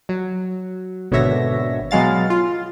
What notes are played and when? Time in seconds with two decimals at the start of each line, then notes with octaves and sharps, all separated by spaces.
0.09 F#3
1.11 G#1 B2 D3 C#5 E5 A#6
1.91 B2 F#3 G#3 F5 A6
2.30 F4